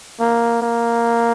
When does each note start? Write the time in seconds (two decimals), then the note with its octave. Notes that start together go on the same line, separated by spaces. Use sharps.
0.20 A#3
0.62 A#3